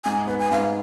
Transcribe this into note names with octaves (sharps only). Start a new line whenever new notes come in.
G#2 G#5
B3 B4
G#5
G#2 F5